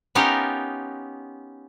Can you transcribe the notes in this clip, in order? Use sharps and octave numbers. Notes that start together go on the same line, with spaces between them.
B3 C#4 D#4 F4 G4 A#4